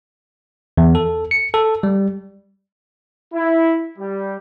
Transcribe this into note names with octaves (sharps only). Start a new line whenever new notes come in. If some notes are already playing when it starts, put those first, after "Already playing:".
E2
A4
C#7
A4
G3
E4
G3